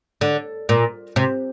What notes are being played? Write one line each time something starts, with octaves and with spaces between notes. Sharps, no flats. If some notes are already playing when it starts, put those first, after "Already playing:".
D3
A#2
C3